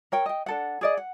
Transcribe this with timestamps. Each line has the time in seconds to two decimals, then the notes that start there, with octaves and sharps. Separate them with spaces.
0.12 A#4 C#5 G5
0.26 D#5 G5
0.46 D4 A4 F#5
0.81 G#4 D5 D#5
0.97 F#5